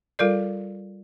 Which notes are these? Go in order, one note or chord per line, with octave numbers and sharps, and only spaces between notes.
G3 F4 A4 A#4 D5